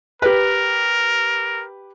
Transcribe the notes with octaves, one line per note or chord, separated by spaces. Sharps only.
G4 A#4 B4